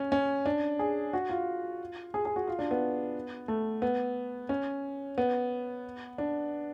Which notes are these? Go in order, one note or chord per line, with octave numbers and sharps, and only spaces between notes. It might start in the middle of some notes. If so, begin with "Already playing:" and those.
Already playing: C#4
C#4
D4
G#4
F#4
F4
G#4
G#4
F#4
F4
D4
B3
A3
B3
C#4
B3
D4